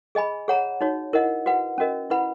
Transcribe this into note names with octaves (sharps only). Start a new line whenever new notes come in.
G#4 D#5 G#5 B5
G#4 C#5 F#5 A#5
D#4 F#4 C#5
E4 A#4 D#5 F#5
F#4 B4 F#5
C#4 F#4 A#4 D#5
E4 B4 F#5 B5